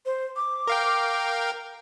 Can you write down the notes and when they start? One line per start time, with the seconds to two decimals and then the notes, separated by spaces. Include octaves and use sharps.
0.06 C5
0.36 D6
0.67 A#4 F5 G5